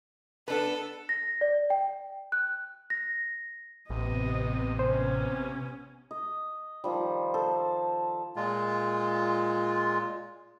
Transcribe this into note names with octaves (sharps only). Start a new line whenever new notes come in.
B3 D4 A4 B4
A#6
D5
G5
F#6
A#6
A1 C3 B3 D#5
B3 C#4 C5
D#5
D#3 F3 G3
A4 C5
A#2 G#3 F4